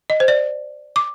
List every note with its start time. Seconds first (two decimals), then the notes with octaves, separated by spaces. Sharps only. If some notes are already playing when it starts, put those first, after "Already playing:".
0.10 D#5
0.20 C5
0.28 D5
0.96 D6